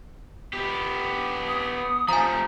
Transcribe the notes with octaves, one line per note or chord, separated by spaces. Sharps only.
B3 G4
D#6
F3 A3 G#5 A#5